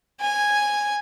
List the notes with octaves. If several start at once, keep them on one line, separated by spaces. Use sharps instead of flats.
G#5